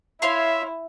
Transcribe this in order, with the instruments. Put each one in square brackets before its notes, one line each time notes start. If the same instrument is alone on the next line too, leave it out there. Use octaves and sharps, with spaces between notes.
[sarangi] E4 [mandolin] C#5 F5 C6 [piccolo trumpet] E5